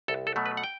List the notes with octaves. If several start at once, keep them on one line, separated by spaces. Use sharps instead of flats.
C2 A4
A4
B2 F#3 A3
B4
F#5
G5